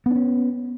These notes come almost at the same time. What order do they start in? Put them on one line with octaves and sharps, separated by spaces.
B3 D4 C#4